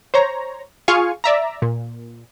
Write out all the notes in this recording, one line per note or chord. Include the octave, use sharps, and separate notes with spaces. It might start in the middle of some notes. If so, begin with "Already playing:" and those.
C5 C#5 A#5
F4 G#4 F5 G#5 C#6
D5 E5 A#5
A#2